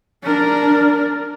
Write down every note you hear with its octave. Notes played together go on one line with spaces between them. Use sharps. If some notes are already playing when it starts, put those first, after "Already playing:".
D4 A#4